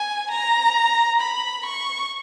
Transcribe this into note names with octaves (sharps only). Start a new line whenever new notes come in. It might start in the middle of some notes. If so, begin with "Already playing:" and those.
Already playing: G#5
A#5
B5
C#6